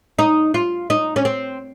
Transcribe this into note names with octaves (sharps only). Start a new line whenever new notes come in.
D#4
F4
D#4
C#4
C4